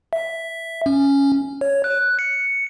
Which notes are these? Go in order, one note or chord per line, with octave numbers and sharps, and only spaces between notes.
E5
C#4
C#5
F#6
C#7